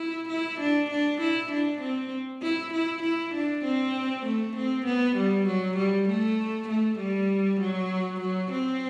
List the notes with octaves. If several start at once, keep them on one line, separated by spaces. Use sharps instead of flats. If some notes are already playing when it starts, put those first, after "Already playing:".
Already playing: E4
E4
D4
D4
E4
D4
C4
E4
E4
E4
D4
C4
A3
C4
B3
G3
F#3
G3
A3
A3
G3
F#3
F#3
C4